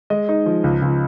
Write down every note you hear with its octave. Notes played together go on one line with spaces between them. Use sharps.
G#3 D#5
D#4
F3
C#2
C#2